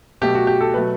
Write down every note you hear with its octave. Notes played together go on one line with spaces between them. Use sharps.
B2 F#3 A3 G4
F#4
G4
A4
B2 F#3 A3 B4